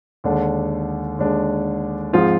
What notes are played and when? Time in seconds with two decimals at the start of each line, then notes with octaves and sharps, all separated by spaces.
0.24 D#2 D3 G#3 D4
1.19 D#2 D3 G#3 D4
2.13 G#2 F3 C4 F4 G#4